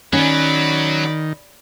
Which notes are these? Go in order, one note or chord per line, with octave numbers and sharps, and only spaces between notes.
D#3 F#3 C#4 D5 B5